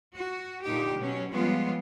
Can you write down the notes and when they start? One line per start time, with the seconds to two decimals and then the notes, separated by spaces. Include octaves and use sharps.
0.15 F#4
0.65 A#2 D3 D#4 G4
0.97 B2 F#3 C#4
1.32 F3 G3 G#3 B3 C#4 F4